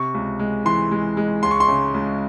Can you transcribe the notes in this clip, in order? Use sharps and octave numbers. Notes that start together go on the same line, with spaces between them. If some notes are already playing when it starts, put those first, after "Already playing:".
Already playing: C3 C#6
C#2
G#3
E3 C6
G#3
G#3
C#2 C6
C#6
C6
C#3
C#2